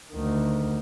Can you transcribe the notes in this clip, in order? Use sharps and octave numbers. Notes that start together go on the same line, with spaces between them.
D2 D#3